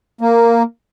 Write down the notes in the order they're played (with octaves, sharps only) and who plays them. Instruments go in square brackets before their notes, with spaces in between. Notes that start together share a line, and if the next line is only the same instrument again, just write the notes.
[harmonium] A#3